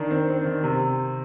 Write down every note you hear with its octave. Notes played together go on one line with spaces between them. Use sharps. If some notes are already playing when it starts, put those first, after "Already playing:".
Already playing: D#3 D4
C4
C4
D#3
C3